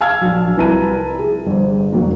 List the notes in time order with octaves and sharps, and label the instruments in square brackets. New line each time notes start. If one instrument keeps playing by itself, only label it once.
[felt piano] F5 G#5 A5 E6 F6 G#6
A#1 F#3
C2 E4 B4 A5 A#5 D#7
G#4
G1 C5
E1 F#3 A#3